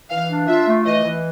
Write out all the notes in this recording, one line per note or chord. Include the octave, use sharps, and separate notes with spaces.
E3 F5
D4
F4 E5
A3
E3 D#5
E3